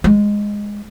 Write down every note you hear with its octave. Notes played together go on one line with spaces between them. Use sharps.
G#3